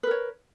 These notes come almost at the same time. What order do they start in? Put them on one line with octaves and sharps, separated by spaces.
B4 A#4 C#5